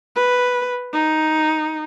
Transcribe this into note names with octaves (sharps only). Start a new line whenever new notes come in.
B4
D#4